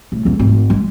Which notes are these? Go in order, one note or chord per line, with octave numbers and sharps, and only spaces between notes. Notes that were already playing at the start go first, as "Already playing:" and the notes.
A2
D#1 E2
G#1
G#3